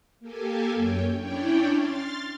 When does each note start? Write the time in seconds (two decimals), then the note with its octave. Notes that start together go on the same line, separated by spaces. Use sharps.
0.20 A#3 G4 A4 G#5
0.74 F#2 C#5 G5
1.16 C#4 D4 E4 C#5 D5 G5
1.76 C6 F6 A6